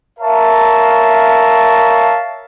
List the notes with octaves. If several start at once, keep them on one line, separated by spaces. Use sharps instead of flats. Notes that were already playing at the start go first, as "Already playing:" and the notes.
A#4 C#5 E5 F5 A5